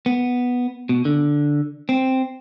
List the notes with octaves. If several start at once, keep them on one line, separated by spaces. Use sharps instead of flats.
B3
B2
D3
C4